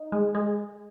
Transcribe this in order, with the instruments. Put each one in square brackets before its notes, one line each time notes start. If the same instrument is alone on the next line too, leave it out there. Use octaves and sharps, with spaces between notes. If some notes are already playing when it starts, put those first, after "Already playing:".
Already playing: [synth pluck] D#4
G#3
G#3